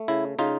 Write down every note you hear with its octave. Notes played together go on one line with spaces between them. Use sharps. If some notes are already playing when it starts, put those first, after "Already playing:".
Already playing: A3
C#3 E4
C#3 D#4 F4